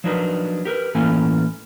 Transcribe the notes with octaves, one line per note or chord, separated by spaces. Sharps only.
F3 F#3 D4 D#4 A#4 B4
G4 A#4 B4
A2 E3 A#3 C#4 A4 G#5